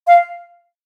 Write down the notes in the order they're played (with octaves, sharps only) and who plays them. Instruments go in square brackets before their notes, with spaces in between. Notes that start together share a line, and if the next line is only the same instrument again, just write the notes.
[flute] F5